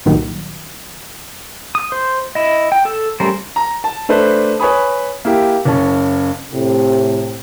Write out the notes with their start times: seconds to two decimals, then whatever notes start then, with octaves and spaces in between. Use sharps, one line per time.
0.06 C2 G2 A#2 D#3 F#3
1.75 D#6
1.92 C5
2.35 E4 D#5
2.72 G5
2.85 A4 E6
3.20 G3 A3 C#4 A#4 C5
3.56 A#5
3.84 A5
4.09 A3 D4 B4 C5
4.59 B4 C#5 G#5 B5 D#6
5.25 A#3 E4 G4
5.65 F#1 C#4 A5
6.53 A2 C3